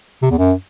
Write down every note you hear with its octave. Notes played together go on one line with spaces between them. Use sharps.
C3
E2
F#2